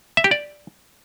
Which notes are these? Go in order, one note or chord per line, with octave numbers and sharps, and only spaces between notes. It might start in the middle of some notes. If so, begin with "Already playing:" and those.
E5
G4
D5